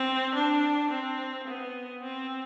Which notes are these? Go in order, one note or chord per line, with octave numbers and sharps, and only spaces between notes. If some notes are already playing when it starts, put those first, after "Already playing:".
Already playing: C4
D4
C4
B3
C4